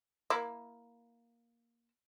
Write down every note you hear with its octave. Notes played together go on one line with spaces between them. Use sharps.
A#3 E4